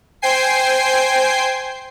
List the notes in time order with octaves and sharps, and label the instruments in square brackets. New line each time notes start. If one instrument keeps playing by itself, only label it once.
[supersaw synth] C5 G5 G#5 C7